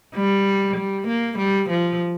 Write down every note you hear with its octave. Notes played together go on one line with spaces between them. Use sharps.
G3
G3
A#3
G3
F3